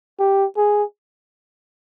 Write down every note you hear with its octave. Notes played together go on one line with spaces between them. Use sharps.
G4
G#4